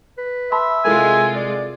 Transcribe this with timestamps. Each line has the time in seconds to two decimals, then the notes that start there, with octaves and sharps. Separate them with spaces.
0.18 B4
0.52 E5 A5 B5 C6
0.85 C3 G#3 E4 F4 A4 A#4 G#5
1.35 D5